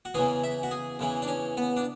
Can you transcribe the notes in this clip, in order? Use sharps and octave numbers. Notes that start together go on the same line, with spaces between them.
F#4
E2 C#3 E3 G#4
E5
F#4
G#4
E2 C#3 E3
D4
C#4
B3
D4